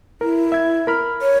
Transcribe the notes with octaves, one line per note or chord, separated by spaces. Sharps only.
E4 A#4
E5 G#6
A#4 B5 F6
C#5